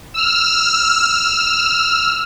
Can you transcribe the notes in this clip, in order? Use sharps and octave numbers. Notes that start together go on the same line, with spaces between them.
E6 F6